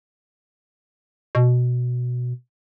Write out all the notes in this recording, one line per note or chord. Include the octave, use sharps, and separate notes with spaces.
B2